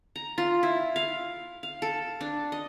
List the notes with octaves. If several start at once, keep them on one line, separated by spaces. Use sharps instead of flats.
A#5
F4
E4
F5
F5
A4
D4
D#5